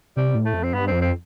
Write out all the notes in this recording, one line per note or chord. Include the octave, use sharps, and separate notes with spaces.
C3 G3
A2
A3
F2
C4
G2 B3
F2 C4
C4